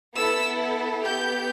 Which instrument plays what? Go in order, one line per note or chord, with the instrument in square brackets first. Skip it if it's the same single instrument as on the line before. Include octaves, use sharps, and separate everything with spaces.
[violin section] B3 E4 A4 E6
B3 G4 G6